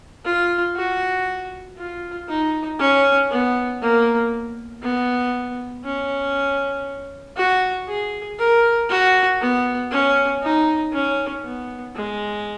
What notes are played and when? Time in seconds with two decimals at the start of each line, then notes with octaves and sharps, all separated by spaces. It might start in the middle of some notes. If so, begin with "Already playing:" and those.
0.25 F4
0.76 F#4
1.78 F4
2.29 D#4
2.79 C#4
3.31 B3
3.81 A#3
4.83 B3
5.85 C#4
7.37 F#4
7.88 G#4
8.39 A#4
8.89 F#4
9.41 B3
9.91 C#4
10.43 D#4
10.93 C#4
11.44 B3
11.95 G#3